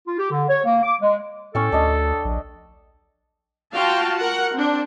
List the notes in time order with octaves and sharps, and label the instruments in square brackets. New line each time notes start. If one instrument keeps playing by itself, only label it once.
[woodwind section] F4
G4
D3
C#5
A#3
D6
G#3
[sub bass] A2 [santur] C#4 G5 [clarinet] A4
[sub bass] D2 [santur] D4 D#5
[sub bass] A#1
[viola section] F4 F#4 F5 G5 A5
F#4 A#4 F#5
C4 D4